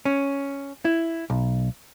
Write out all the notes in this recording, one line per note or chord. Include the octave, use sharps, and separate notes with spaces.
C#4
E4
B1